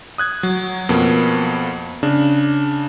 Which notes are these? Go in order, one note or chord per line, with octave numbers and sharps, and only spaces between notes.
D#6 F#6 G#6
F#3
F2 B2 A#3
C#3 D4